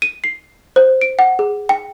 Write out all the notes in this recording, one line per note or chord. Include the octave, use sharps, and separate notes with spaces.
D#7
C7
C5
D7
F#5
G#4
G5